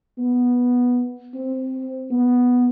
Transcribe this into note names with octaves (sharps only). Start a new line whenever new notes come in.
B3
C4
B3